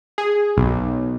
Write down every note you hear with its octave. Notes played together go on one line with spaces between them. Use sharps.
G#4
B1